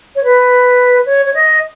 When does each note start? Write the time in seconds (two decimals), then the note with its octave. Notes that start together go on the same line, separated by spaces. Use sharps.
0.16 C#5
0.24 B4
1.06 C#5
1.26 C#5
1.34 D#5